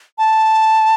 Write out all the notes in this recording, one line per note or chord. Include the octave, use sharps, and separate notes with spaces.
A5